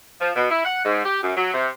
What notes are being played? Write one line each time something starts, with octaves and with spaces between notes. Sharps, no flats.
F3
B2
E4
F#5
G#2
G4
F#2
F#3
C3